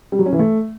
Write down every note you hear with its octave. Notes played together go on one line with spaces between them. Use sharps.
G3
F#3
C#4
E3
A3